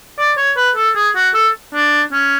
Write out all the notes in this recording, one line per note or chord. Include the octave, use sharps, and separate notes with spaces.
D5
C#5
B4
A4
G#4
F#4
A4
D4
C#4